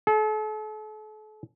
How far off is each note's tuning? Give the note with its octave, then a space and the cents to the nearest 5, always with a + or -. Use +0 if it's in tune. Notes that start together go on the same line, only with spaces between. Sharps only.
A4 -40